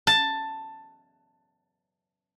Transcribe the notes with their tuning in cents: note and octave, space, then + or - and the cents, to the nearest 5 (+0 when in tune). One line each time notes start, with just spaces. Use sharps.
A5 +10